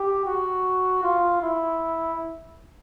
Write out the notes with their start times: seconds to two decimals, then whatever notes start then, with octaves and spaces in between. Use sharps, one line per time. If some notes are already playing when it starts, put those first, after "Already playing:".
Already playing: G4
0.25 F#4
1.03 F4
1.42 E4